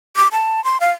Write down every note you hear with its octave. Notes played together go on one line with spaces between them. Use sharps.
D6
A5
C6
F5